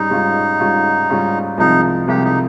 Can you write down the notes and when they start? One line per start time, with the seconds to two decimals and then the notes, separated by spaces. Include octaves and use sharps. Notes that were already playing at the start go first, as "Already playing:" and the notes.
Already playing: G#2 G3 C#4 D#4
0.10 G#2 G3 C#4 F4
0.60 G#2 G3 C#4 F4
1.09 G#2 G3 C#4 F4
1.58 C2 C3 F3 G#3 D#4
2.07 C2 C3 F3 G#3 G4
2.24 D#4